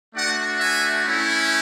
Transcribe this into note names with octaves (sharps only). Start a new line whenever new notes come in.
A3 D4 F#4 D5 F#5
E5 G#5
A3 C#4 E4